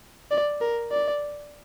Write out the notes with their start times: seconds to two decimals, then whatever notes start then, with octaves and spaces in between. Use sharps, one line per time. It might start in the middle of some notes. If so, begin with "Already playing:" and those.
0.31 D5
0.61 A#4
0.92 D5